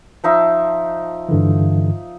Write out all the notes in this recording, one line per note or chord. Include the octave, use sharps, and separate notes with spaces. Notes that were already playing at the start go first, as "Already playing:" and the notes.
F3 D#4 E5
G2 D3 E3